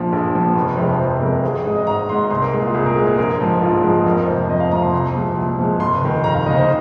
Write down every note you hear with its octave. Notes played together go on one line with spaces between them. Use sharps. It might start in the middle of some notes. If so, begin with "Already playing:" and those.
Already playing: A#1 A#2 F3
A#1
A#2 F3
F1
F2 C3 G#3
F1 C5
F2 C3 G#3 A#4
G#1 G#4
G#4
G#2 G#3 G#4
D#5
G#1 A#5
G#2 G#3 C6
C2 C6
A#4
A#2 G#3 G#4
F4
C2 G#4
A#4
A#2 G#3 G#4
G#4
A#1 A#4
G#2 F3
A#1 F4
G#2 F3 G#4
F2 A#4
A#4
C3 F3 C5
F2 D#5
F5
C3 F3 A#5
C6
C2
A#2 F3 G#3
C2
A#2 F3 G#3
F1 C6
D#2 D#3
F1 A#5
F5
D#2 D#3 D#5
C5